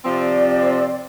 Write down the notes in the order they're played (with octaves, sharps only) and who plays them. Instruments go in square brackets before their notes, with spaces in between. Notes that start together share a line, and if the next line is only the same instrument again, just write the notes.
[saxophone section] C3 F3 C4 [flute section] D5